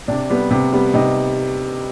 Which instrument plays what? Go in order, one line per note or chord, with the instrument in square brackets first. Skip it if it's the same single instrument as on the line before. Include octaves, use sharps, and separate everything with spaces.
[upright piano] C3 D4
G3 B3
C3
G3 B3
C3 D#4